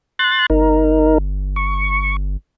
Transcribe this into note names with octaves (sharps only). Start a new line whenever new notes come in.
C6 F#6 A6
G1 D#4 A#4
C#6